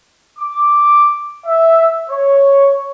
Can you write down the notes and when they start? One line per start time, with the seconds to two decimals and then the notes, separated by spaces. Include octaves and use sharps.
0.39 D6
1.46 E5
2.10 C#5